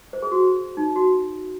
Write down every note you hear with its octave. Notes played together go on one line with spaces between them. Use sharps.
C5
G#4
F#4
D#4
F#4